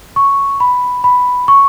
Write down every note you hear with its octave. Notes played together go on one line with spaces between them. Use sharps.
C#6
B5
B5
C#6